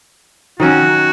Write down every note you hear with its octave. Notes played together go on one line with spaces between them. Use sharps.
D#3 F#3 C#4 F#4